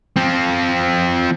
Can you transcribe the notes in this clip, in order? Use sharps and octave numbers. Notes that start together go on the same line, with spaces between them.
F3 C4